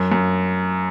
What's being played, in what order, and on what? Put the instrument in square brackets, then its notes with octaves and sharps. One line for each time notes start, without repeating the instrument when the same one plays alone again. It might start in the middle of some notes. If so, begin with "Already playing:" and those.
Already playing: [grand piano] F#2
F#2